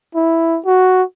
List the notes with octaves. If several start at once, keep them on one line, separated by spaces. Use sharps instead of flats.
E4
F#4